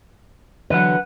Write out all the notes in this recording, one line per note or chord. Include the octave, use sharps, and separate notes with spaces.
D3 E3 F#3 B4 F#5